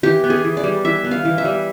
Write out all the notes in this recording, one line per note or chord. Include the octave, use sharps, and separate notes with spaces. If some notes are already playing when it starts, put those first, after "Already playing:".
E3 G4
B3
G#4
E3
D5
G3
E3 E5
B3
F5
E3
E5
G3